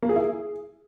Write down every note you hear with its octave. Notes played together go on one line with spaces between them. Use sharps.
A#3
G#4
E4
G#4